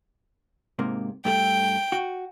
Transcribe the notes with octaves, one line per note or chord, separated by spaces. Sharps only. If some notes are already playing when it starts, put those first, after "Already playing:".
G#2 C3 A#3
G2 A3 A4 G5
F#4